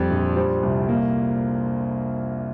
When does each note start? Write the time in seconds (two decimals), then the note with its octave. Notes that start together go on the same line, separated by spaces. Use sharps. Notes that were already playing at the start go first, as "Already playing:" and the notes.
Already playing: F2 G3
0.10 A#1
0.36 G3 C5
0.63 C2
0.89 A#3